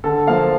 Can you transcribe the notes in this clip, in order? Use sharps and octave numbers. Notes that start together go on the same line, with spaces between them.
D3 A4
F3 A#3 F5